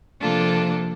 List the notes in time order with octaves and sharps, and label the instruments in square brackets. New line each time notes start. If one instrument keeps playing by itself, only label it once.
[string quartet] C3 F3 A#3 D4 F4 A4